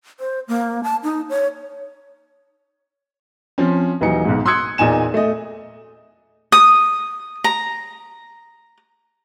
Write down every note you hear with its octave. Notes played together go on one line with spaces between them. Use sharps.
C5
A#3
A5
D#4
C#5
F3 C4 C#4
D#1 E3 F#3 D#4 C#7
B1 G#2
C6 D#6 E6 F#6 G#6 C#7
E2 A#2 D#4 G#5 E7
A3 D#5
D#6
A#5